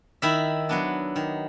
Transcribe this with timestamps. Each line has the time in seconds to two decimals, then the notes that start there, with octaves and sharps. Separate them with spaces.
0.22 D#3 E4 E5
0.69 F#3 B3 D4
1.16 D#3